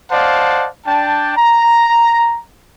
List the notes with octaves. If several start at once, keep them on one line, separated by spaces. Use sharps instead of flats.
C5 D5 D#5 F5 F#5 A5
D4 G5 A5
A#5